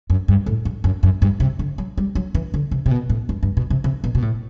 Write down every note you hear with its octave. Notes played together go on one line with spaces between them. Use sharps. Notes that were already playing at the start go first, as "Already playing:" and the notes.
F#2
G2
A2
G2
F#2
F#2
G2
C3
D3
F#3
G3
F#3
E3
D3
C3
C3
B2
A2
G2
G2
B2
C3
C3
B2
B2
A2